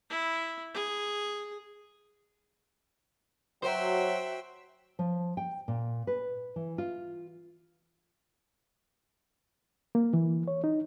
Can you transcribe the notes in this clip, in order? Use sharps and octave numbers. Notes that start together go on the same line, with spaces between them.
E4
G#4
F#3 F#4 C5 E5 G5 C6
F3
G5
A#2
B4
E3
F4
A#3
E3
C#5
D#4